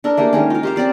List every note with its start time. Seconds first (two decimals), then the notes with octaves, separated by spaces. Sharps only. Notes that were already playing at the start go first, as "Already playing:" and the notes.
0.04 D4 A4 A#4
0.17 A3 A#3 G4 G#4
0.33 D#3 G#3 C#4
0.50 F4 A#4
0.63 G4 C5 F5
0.76 C4 C#4 D5 F5